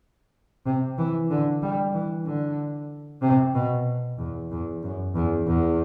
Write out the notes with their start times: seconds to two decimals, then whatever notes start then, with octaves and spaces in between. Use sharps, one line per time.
0.66 C3
0.99 E3
1.30 D3
1.62 G3
1.94 E3
2.26 D3
3.23 C3
3.55 B2
4.18 E2
4.51 E2
4.83 F#2
5.16 E2
5.47 E2